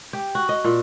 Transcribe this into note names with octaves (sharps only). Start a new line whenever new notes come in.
G4
F#4
D#5
A#2